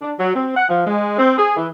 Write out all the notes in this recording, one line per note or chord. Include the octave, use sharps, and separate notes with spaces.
D4
F#3
C4
F#5
F3
G#3
C4
G#4
E3